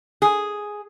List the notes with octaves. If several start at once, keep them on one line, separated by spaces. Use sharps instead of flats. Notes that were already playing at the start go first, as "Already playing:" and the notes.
G#4